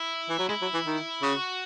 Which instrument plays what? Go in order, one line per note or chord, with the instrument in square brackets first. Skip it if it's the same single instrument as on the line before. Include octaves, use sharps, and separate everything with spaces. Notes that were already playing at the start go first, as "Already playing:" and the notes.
Already playing: [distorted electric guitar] E4
[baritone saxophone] E3
F#3
[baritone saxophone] G#3 [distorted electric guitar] E4
[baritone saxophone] F#3
E3
D#3
[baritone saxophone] C#3 [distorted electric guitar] F#4